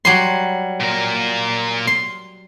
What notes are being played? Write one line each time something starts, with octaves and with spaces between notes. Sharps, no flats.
F#3 G3 C6
A#2 A#4
C6